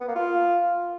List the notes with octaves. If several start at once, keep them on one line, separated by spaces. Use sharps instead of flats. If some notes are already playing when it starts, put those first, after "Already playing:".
B3
A#3
F4